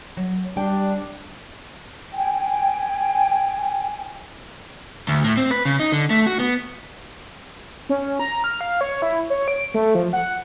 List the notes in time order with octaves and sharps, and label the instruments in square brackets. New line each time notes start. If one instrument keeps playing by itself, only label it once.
[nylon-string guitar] F#3
[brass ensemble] G3 D4 [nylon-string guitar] G5
[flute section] G5 G#5
[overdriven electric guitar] D2
A2
C4
B4
C#3
D#4
D3
A3
F#4
B3
[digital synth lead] C#4
A#5
F6
F5
C#5
E4
C#5
D7
A3
F3
F#5